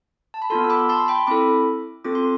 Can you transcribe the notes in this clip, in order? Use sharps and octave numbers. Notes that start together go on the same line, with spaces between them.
A5
B5
B3 F4 A4 A5 C6
E6
B5 D6
A5 C6
G5 B5
C4 E4 A4 B5 D6
C4 F4 A4 D6
C6